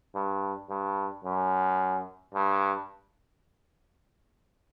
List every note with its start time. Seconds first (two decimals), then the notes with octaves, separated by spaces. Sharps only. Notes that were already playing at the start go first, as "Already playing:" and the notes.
0.15 G2
0.70 G2
1.24 F#2
2.34 G2